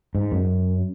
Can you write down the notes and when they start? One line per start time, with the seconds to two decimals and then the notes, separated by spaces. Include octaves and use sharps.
0.15 G#2
0.32 F#2